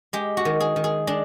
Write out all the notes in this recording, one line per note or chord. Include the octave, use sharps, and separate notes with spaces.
G#3 G4
F#4
D#3
G#4
D#3
G#4
G#3 D4